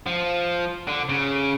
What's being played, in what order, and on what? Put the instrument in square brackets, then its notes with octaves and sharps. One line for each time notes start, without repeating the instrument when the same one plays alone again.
[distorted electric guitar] F3
D3
C#3